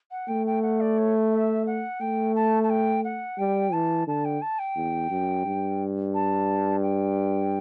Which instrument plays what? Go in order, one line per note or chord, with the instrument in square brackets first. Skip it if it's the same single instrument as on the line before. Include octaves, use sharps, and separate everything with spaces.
[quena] F#5
[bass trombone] A3 [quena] G5
[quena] G5
F#5
D5
C#5
E5
F#5
[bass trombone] A3 [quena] G5
[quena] A5
A5
G5
F#5
[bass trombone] G3 [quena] G5
[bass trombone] E3 [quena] A5
[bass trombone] D3 [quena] A5
[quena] G5
A5
G5
[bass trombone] E2
F#2
G2
[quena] A5
G5